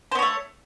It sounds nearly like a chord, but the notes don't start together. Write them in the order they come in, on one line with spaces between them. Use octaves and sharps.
C5 B3 C#5 A3